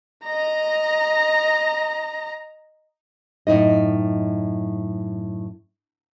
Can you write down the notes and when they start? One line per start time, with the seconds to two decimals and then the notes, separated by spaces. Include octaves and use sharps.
0.27 D#5 A#5
3.47 F#2 A2 D#4 D#5